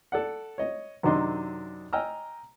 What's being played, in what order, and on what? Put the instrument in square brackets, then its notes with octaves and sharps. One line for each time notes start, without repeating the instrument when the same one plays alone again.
[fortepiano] A4 D5 F#5
C#5 D#5
F#2 C3 D#3 D4 D#5 C6
D#5 G5 G#5 A#5 E6 F6